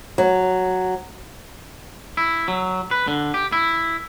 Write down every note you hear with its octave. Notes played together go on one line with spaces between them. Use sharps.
F#3
E4
F#3
B4
D3
G4
E4